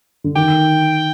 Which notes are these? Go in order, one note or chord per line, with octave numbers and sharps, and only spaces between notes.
D3
D#3 G5